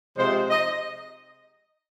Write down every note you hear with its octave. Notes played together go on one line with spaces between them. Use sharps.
C3 F3 G#3 C5
D#5